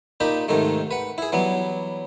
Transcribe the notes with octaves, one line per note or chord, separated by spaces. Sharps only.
A#2 D#4 G4 B5
G#2 C3 D#3 A3
B4 F#5
E4 G#4
E3 F#3 G3 B3